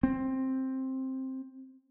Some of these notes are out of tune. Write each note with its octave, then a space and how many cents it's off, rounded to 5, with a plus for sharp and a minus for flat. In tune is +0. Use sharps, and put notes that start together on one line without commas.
C4 +10